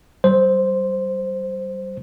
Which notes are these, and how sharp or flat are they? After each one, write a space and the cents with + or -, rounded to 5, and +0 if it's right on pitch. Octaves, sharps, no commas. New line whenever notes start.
G3 -30 C5 +0